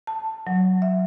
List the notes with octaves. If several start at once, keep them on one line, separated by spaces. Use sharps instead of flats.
A5
F#3
E5